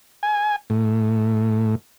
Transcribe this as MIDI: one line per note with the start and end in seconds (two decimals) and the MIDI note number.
0.23 0.56 80
0.70 1.75 45